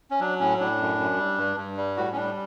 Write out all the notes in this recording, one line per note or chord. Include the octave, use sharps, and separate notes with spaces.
C#4
F#3 D4
A2 C#4
A2 D4
F#2
F#2
G3
G2
G2
G3
A2 F#4
C#4
G3 D4